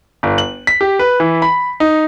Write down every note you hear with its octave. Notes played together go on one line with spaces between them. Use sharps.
G1
F#7
B6
G4
B4
E3
B5
D#4